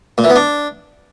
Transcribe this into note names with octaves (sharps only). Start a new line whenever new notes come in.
A#2
E3
B3
D4